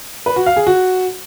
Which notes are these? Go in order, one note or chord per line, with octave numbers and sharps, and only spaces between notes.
B4
F#4
F5
G#4
F#4